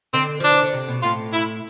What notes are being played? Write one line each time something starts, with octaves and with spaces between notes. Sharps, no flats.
D3 C4
F3 D4
E3
D3
C3
B2
A2 F4
E4